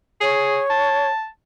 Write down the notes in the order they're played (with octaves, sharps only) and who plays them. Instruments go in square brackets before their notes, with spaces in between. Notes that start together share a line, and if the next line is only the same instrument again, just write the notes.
[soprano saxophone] G#4 [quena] C#5
[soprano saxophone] A5